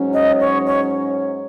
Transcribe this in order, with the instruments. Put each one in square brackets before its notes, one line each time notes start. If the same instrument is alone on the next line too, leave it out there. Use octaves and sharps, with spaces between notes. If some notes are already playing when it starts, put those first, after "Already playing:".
Already playing: [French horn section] G#2 F#3 C#4
[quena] D#5
C#5
C#5